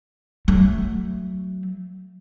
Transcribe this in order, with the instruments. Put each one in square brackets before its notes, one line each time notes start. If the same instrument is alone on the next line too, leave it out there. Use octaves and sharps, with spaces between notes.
[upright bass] F#3 A3